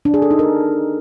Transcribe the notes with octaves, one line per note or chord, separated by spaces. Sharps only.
D4
G#4
A4
D#4
A#4